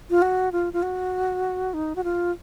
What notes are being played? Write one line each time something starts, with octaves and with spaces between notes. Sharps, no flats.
F4
F#4
F4
F4
F#4
D#4
F#4
F4